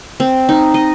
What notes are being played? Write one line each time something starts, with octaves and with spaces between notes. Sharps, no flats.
C4
D#4
D#5